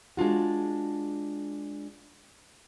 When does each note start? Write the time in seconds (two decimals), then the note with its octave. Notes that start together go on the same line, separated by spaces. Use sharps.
0.17 G#3 D4 F4 F#4